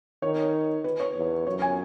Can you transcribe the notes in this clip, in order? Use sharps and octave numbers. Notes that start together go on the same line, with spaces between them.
D#3 C#5
B4
C#5
E2
F#2 C#5
G#5